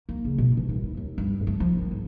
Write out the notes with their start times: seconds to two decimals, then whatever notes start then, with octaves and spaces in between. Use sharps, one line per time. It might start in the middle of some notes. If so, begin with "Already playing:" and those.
0.09 A#3
0.25 C#3
0.38 B2
0.57 E3
0.69 D#1
0.83 E4
0.97 D#2
1.18 G2
1.47 A3
1.60 F3
1.77 D#3
1.91 G#2